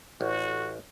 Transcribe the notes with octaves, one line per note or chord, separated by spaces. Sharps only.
A1 F#4